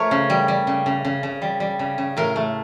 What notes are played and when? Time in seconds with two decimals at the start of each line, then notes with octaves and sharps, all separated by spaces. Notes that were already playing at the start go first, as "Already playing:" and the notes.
Already playing: F3 A3 A#4 C#5
0.11 C#3
0.30 G3
0.48 G3
0.67 C#3
0.86 C#3
1.05 C#3
1.23 C#3
1.42 G3
1.60 G3
1.79 C#3
1.98 C#3
2.17 A2 A#4
2.36 A3